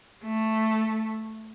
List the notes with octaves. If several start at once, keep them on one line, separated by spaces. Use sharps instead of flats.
A3